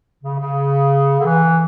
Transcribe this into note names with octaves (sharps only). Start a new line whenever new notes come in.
C#3
C#3
D3
E3